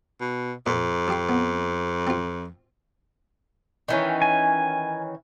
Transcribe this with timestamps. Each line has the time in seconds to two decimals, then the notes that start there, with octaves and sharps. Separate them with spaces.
0.21 B2
0.66 F2 A#2
1.08 F3 G4 C6
1.29 B3
2.07 C4 F4
3.88 D#3 E3 C#4
4.22 G#5